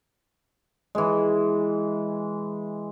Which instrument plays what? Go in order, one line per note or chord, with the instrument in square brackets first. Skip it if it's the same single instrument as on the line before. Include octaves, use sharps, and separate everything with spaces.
[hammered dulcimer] E3 G#3